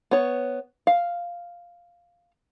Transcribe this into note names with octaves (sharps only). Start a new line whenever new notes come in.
B3 C#5
F5